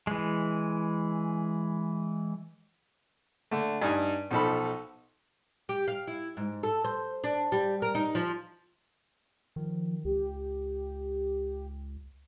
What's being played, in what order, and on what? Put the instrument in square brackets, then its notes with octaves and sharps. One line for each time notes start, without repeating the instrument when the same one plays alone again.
[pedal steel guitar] E3 G#3
[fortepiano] D3 A3
G2 D#4 G#5
B1 F3 D#4 A4 B5
[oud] G4
F5
E4
G#2
A4
C5
D4
G3
A#4
D#4
F3
[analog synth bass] D#3 [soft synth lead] F3
[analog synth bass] C#2 [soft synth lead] G4